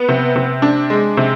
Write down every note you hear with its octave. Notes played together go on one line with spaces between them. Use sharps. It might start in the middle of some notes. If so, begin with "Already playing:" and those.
Already playing: B3
C3
C3
D4
G#3
C3